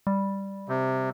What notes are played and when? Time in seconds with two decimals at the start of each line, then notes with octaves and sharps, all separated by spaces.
0.07 G3
0.69 C3